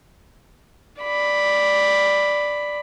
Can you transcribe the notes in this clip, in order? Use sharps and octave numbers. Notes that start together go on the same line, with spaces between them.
D5 B5